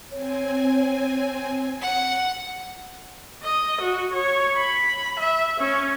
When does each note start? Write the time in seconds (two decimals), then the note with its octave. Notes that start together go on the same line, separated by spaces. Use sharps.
0.11 C4 C#5 G#5
1.81 F#5
3.43 D#5
3.81 F#4
4.13 C#5
4.56 B5
5.20 E5
5.60 C#4